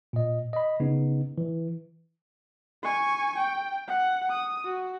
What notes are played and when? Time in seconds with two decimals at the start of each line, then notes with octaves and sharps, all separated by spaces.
0.13 A#2 D#5
0.53 D#5 B5
0.80 C#3 B3 D#4
1.38 E3
2.84 G#5 C#6
3.37 G5
3.88 F#5
4.30 D#6
4.65 F#4